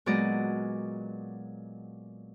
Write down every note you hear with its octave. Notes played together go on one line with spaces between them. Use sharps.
A#2 F#3 G#3 B3 D5 D#5